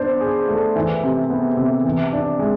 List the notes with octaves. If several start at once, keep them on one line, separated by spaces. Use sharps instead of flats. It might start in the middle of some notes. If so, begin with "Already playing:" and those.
Already playing: B3 D4 C5
G#4
A3
E3
C3
B3
C3
E3
D4
G#3